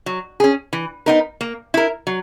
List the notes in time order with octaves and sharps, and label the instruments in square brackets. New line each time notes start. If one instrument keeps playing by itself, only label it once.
[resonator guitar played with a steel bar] F#3
C#4 G#4
E3
B3 D#4 A#4
A#3
E4 A#4
F#3